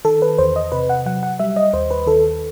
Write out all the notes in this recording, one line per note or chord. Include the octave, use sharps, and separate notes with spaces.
D#3 A4
B4
E2 C5
D#5
C3 B4
F#5
F#3 F#5
F#5
G3 E5
D#5
D#2 C5
B4
D#3 A4